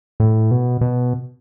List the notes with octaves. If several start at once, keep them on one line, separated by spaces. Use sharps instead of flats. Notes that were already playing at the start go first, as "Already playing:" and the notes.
A2
B2
B2